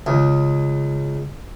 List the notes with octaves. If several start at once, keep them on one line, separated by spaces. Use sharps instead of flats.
C#2